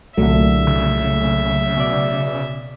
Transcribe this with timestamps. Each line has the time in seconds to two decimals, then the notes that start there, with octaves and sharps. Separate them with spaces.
0.17 C2 A#2 D3 F#3 A3 E5
0.67 C#3
1.77 B2 D5